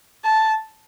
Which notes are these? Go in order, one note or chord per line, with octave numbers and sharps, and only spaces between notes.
A5